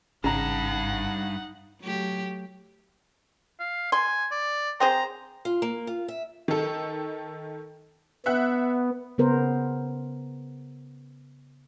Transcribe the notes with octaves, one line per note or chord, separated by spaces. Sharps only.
G#1 G2 C#3 D#4 F#5 A#5
F#3 A3 G4
F5
G#5 C6
D5
C4 G#4 C5 A#5
F4
A#3
F4
E5
D#3 A4
B3 E5 F#5 F#6
C#3 B3 A#4 C5